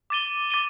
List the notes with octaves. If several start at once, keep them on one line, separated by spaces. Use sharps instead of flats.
D6 A6 D#7 G7
D6 A6 D#7 G7